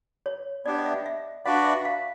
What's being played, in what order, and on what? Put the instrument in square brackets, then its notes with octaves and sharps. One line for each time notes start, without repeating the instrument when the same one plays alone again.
[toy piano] C#5
[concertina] B3 D4 G4 [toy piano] D5
[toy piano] D#5
E5
E5
[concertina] D4 F#4 B4 D5 [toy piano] F5
[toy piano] E5
F5